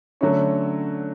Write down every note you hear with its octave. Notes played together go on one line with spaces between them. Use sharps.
D3 F#3 A3 C#4